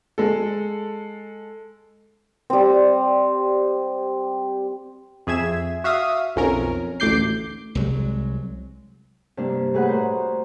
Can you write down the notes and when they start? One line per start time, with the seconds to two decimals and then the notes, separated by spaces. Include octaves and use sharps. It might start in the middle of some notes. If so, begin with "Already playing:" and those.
0.18 G#3 A4
2.50 G3 C4
5.27 F2 G#4 E5 G#6 E7
5.84 F#4 E5 F5 D#6
6.36 B1 F2 C#4 A#4
7.00 A1 D2 D6 G6 C7
7.75 C2 F#3 G#3
9.37 G2 C3 A#3 D4
9.74 A2 G#4 B4 F#5
9.88 F#4 A#4 C5